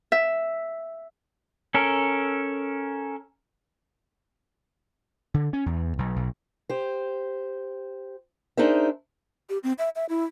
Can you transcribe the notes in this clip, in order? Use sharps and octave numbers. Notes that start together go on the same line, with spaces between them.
E5
C#4 A4 A#4
D3
C#4
E2
B1
B1
G4 C5
D4 D#4 G#4 A#4 C5 E5
G4
C4
E5
E5
E4